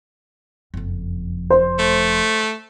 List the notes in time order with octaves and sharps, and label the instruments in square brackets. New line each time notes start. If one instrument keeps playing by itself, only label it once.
[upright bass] F#1 F2
[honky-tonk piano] C5
[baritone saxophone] A3